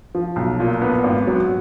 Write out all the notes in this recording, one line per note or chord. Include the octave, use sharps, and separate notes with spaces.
F3
B1
A#2
B3
G#1
F#3